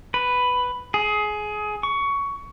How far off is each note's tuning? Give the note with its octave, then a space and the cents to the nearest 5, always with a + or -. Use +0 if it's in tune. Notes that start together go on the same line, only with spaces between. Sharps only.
B4 +5
G#4 +20
C#6 +15